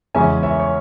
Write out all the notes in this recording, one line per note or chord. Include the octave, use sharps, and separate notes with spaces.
E2 C#3 G#3 C#4 E5 G#5
C#5 E5
C#5